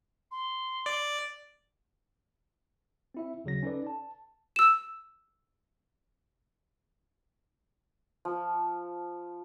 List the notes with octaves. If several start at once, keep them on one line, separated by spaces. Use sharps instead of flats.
C6
D5
C4 E4 E5
D#2 C#3 F#3 A#6
C#4 D#4 A4 B4 D5
A5
E6 E7
F3